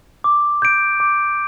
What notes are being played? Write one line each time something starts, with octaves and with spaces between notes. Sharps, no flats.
D6
G6 D7
D6